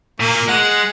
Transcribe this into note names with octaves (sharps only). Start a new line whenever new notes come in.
A#2 A#3
G#3 F#5